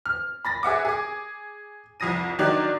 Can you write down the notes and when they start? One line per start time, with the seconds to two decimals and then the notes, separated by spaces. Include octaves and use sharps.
0.06 F6
0.45 B5 A6 A#6
0.63 G#4 E5 F#5 D6
0.85 G#4 D6
2.00 C2 F2 D#6 A#6 D#7
2.39 D#3 F#3 D4 F#4 D5